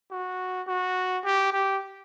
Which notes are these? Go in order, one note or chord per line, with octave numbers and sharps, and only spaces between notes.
F#4
F#4
G4
G4